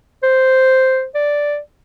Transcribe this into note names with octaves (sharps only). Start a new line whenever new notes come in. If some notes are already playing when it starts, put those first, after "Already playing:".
C5
D5